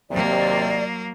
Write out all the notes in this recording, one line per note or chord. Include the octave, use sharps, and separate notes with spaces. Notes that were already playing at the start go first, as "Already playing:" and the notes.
D#2 C3 F#3 A#3 D5